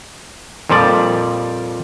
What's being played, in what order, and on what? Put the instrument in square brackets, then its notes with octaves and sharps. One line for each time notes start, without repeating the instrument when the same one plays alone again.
[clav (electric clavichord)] F2 A#2 F3 G3 D5